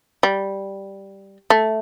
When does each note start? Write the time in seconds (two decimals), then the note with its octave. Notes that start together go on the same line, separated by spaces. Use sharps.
0.23 G3
1.50 A3